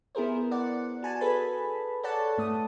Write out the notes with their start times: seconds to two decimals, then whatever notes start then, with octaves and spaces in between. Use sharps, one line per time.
0.15 B3 E4 G#4 A#4 C5
0.51 D5 F#5
1.03 F#4 G#5 A5
1.21 G#4 A4 B4 B5
2.03 A4 C#5 D5 F#5 A5
2.38 G#2 A3 D#6